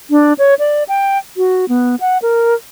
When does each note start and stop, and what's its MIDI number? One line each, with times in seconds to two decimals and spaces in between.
0.10 0.33 62
0.38 0.54 73
0.59 0.83 74
0.88 1.18 79
1.37 1.65 66
1.69 1.95 59
2.00 2.18 78
2.22 2.54 70